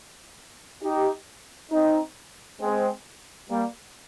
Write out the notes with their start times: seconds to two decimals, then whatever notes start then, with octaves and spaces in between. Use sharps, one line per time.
0.82 D#4 G4
1.71 C4 D#4
2.60 G#3 C4
3.49 G3 A#3